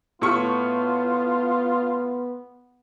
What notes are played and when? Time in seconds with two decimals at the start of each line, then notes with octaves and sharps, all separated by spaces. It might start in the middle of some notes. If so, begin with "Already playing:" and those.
0.22 A2 B3 F4 C#6 F6